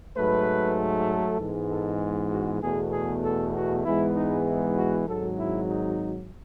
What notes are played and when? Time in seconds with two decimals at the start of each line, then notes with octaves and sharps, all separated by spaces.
0.16 G#2 F#3 A3 B4
1.08 A4
1.38 G#2 E3 G#3 B3
1.70 A4
2.31 F#4
2.61 E2 B2 A3 G#4
2.92 G#4
3.24 A4
3.54 F#4
3.84 G#2 E3 G#3 B3 E4
4.15 D#4
4.46 E4
4.77 F#4
5.07 G#1 G#2 F#3 A4
5.38 E4
5.69 D#4